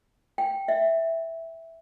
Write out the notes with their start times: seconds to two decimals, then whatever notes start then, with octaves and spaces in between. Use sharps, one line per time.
0.38 G5
0.68 E5